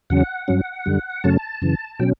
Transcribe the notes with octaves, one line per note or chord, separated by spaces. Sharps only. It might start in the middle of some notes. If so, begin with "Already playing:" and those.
E2 C#3 F#3 C#4 F#5
G2 F#3 C#4
F#2 D3 G3
F#2 C#3 F#3 A3 C#4 A5
F#2 C#3 E3
B2 F#3 C#4 G5